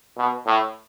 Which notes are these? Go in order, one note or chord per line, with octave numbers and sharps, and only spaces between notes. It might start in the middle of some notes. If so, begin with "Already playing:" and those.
B2
A2